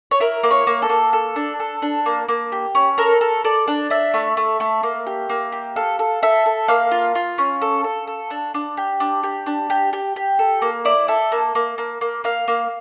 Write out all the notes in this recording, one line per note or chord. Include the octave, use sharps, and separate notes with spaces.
C#5
E4 A#4
A#3
C#5
A#3
A4
A#3
A4
D4
A4
D4
A#3
A#3
G4
C#4
A4 A#4
A4
A4 D5
D4
D4 E5
A3
A3
A3
A#3
G4
A#3
G4
A4 F5
A4
A4 E5
A4
A#3 F5
F4
F4
C#4
A4
A4
A4
D4
D4
G4
D4
G4
D4
G4
G4
G4
A4
A#3
E4 D5
A4 E5
A#3
A#3
A#3
A#3
A#3 F5
A#3